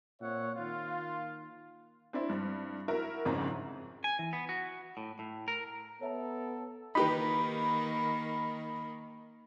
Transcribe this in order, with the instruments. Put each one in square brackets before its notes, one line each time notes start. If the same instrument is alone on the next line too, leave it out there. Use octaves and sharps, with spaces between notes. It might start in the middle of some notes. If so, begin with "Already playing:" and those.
[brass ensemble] A#2 C4 C#5 E5 F#5
D#3 A#3 F4
[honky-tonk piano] C4 D4 E4 C5
G2
E4 F#4 A#4 E5 A#5
G1 F2 G#2 C#3 C4 A#5
[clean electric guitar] G#5
E3
B3
F#4
A2
A2
A#4
[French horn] B3 [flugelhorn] A4 [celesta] C#5 E5 A#5
[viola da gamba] D#3 A#3 [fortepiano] D#4 G4 B4 [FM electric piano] B5